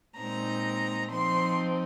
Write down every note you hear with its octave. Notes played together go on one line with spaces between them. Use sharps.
A#2 G#3 C4 D#4 A#5
F3 C4 D#4 C6